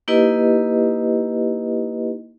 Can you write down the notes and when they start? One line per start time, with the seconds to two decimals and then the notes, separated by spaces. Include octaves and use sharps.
0.08 A#3 D#4 E4 G4 B4 D#5